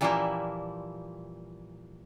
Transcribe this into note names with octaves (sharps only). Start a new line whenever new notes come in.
A#2 E3 F3 G3 A#3 E4